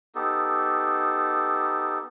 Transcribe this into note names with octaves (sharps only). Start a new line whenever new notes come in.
B3 D#4 G4 A4